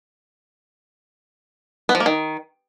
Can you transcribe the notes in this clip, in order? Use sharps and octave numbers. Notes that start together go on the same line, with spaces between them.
B3
F3
A#3
D#3